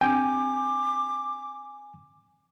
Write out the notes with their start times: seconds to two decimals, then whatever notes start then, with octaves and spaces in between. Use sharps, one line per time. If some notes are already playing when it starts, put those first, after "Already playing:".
0.01 C4 D4 G5 G#5 D6